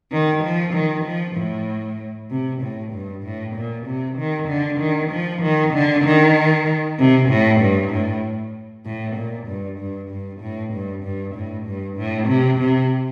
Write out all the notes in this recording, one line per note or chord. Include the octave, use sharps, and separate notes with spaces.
D#3
F3
D#3
F3
A2
C3
A2
G2
A2
A#2
C3
D#3
D3
D#3
F3
D#3
D3
D#3
C3
A2
G2
A2
A2
A#2
G2
G2
G2
A2
G2
G2
A2
G2
A2
C3
C3